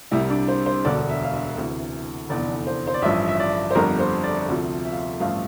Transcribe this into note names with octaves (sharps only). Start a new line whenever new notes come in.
C2 C3 G3 E4
D4
C5
C5
E1 D2 D3 D5
E5
F5
E5
D2 C3 E3
F1 E2 D3 D5
C5
C5
D5
A1 G2 F3 E5
E5
D5
C5
G1 F2 D3 G3 A#4
C5
D5
D2 C3 F3
E5
F5
E5
A1 G2 F3 A3 F5